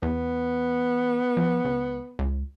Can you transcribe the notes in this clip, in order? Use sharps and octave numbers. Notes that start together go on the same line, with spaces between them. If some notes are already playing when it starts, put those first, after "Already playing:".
E2 B3
F3
C#2
C#2